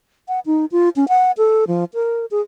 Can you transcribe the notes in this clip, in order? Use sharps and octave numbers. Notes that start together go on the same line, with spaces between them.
F#5
D#4
F4
C#4
F#5
A4
F3
A#4
G#4